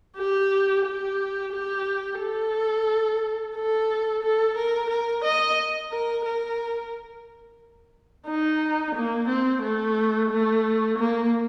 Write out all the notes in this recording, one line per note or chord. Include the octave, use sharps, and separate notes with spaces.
G4
G4
G4
A4
A4
A4
A#4
A#4
D#5
A#4
A#4
D#4
A#3
C4
A3
A3
A#3